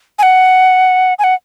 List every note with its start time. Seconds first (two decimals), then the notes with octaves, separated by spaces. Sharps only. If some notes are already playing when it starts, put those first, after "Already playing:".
0.19 G#5
0.23 F#5
1.19 G#5
1.24 F#5